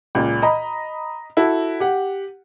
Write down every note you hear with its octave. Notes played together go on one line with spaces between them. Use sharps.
C#2 A#2
D#5 A#5 B5
E4 F#4 A4
G4 F#5